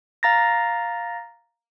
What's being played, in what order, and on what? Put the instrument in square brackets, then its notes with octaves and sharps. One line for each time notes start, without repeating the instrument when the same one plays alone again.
[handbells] F5 A#5 A6 A#6